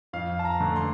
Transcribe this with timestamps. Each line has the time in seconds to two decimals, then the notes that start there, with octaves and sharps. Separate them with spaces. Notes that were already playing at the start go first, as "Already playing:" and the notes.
0.13 F2 F5
0.39 A5
0.45 A#5
0.60 D3 A3
0.76 C6